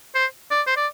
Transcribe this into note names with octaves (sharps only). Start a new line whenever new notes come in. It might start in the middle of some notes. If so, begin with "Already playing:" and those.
C5
D5
C5
D5